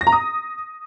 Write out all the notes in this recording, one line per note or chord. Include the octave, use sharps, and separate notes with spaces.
A#6
A#5
D#6